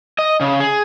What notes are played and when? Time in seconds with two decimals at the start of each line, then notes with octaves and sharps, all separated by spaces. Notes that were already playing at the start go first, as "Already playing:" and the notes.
0.19 D#5
0.41 C#3
0.60 G#4